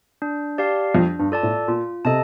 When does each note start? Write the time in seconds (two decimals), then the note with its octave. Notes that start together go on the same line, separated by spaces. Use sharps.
0.22 D4
0.58 G4 D5 F5 A5
0.95 F2 D4
1.19 G2
1.31 F4 A4 D5 A5
1.43 A2
1.68 A#2 F4
2.05 C3 A4 D#5 A5